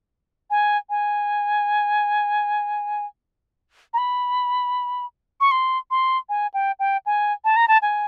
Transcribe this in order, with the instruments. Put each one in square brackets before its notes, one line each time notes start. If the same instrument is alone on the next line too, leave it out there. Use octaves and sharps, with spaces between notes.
[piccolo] G#5
G#5
A#5
B5
C#6
C6
C6
G#5
G5
G5
G#5
A5
A#5
A5
G#5